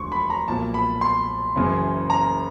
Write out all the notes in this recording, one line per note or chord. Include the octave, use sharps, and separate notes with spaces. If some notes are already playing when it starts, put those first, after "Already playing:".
Already playing: E1 D2 D3 F3 C6 C#6
B5
A#5
B1 A#2 F3 A5
B5
C6
F#1 F#2 C#3 E3
A#5